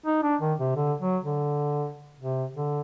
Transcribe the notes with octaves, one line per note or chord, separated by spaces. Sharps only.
D#4
D4
D#3
C3
D3
F#3
D3
C3
D3